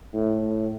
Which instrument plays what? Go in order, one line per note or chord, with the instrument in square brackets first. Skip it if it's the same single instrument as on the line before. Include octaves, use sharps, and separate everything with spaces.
[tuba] A2